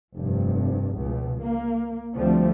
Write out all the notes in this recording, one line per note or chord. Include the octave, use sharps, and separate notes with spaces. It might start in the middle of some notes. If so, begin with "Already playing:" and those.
F1 G2 C3
C#2 B2
A#3
D2 D3 F3 G3 A3 C4